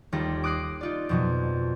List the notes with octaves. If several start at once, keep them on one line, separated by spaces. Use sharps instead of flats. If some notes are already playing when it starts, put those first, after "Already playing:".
D#2 G3 F4 A4 A#6
D6 D#6 F#6 A#6 C7 D7
D#4 F4 D5
F2 B2 F#3